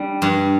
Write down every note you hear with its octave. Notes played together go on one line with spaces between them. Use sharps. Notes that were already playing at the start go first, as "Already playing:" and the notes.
Already playing: G3 D4
G2